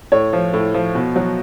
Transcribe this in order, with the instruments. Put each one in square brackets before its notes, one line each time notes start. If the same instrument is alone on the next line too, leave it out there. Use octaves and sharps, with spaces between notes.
[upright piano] A2 C#5
F3
A2
F3
B2
F#3